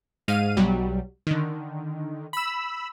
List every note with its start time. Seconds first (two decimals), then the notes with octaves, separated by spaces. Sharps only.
0.28 G#2 F5 D#7
0.57 B1 F#3 G3
1.27 D3 D#3
2.33 B5 E6